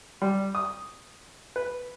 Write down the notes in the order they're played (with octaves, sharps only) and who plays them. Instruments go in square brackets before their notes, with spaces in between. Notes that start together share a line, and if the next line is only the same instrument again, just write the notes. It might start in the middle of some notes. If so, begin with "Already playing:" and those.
[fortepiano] G3
D#6
B4